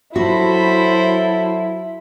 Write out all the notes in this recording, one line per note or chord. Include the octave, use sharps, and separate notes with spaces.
F#3 E4 F#4 A4 C5 B5